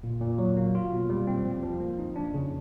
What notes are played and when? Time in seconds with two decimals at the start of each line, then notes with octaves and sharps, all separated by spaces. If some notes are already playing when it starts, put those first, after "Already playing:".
0.03 A#2
0.21 A#2
0.38 F#3
0.57 A#3
0.75 F4
0.93 B2
1.09 G3
1.27 C4
1.46 F3
1.63 F3
1.80 A#3
1.99 D#4
2.16 D4
2.34 C#3